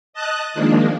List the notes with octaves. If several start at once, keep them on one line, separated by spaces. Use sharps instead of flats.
D#5 A5 D#6 F#6
D#3 F3 G#3 A#3 D4